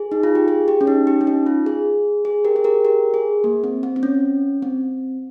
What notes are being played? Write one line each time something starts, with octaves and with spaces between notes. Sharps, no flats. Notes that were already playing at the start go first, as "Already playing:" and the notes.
Already playing: G#4
D#4
F4
G4
G#4
G4
C#4
D#4
G4
C#4
D#4
F4
G#4
G#4
G4 A#4
G#4
G4 A#4
G4 A#4
G#4
A#3
C4
C4
C4
C#4
C4